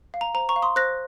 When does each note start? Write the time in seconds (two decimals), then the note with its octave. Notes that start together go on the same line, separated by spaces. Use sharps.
0.14 F5
0.21 A#5
0.34 C5 A#5
0.49 A#5 C#6
0.56 F5
0.62 C6 D#6
0.76 C5 F#6 A#6